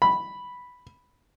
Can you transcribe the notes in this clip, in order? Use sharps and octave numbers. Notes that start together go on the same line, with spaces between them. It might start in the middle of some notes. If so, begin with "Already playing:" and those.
B5